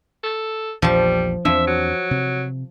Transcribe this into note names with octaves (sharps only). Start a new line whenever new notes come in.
A4
A#1 E2 A#2 F3 G3 A5
E2 F3 C4 D4 E5
F#3
C3